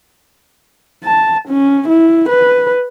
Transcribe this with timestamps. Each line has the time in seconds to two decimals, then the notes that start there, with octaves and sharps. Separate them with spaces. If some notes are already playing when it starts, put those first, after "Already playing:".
1.05 A5
1.48 C#4
1.88 E4
2.29 B4